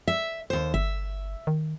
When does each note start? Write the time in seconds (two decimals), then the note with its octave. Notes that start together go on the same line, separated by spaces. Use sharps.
0.08 E5
0.50 D#2 C5
0.74 G1 E5
1.47 D#3